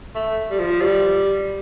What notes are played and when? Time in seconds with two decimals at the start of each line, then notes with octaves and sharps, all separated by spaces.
0.15 A3
0.51 G3
0.59 F3
0.81 G3